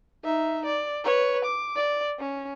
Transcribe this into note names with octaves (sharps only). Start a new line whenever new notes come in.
D#4 E5
D5
B4 C#5
D6
D5
C#4